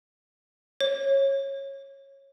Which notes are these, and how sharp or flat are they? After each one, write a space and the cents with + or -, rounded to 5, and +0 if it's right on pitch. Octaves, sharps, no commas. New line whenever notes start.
C#5 -20